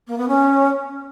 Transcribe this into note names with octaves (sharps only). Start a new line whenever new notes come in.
A#3
B3
C#4